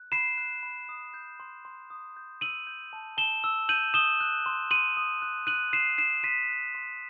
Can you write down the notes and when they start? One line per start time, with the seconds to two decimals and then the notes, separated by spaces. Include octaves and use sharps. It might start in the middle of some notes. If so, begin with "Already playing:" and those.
Already playing: F#6
0.12 B5 C7 E7
0.38 F#6
0.63 B5
0.89 D#6
1.14 G6
1.40 C6
1.65 C6
1.90 D#6
2.17 G6
2.41 E6 D#7 F#7
2.67 G6
2.93 A5
3.17 A5 E7 G7
3.44 E6
3.69 G6 D#7 F#7
3.94 D#6 E7 G7
4.20 F#6
4.46 C6
4.71 C6 D#7 F#7
4.97 D#6
5.22 F#6
5.47 F#6 D#7 F#7
5.73 C6 C7 E7
5.98 F#6 C7 E7
6.23 C6 B6 D#7
6.50 F#6
6.75 C6